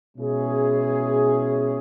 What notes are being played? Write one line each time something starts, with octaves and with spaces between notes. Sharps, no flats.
B2 G#3 C#4 E4 G#4